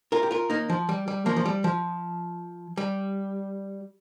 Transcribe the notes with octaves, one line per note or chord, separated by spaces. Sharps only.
F4 A#4
G4
F4 A#4
A#3 D#4
F3
G3
G3
F3 A#3
F3
G3
F3
G3